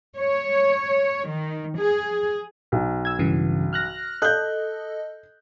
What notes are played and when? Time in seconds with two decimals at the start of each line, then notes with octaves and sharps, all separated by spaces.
0.16 C#5
1.29 D#3
1.77 G#4
2.72 B1
3.05 E6 G#6
3.19 G2 C#3 E3
3.73 F6 F#6 A#6
4.22 A4 D#5 F#6 G6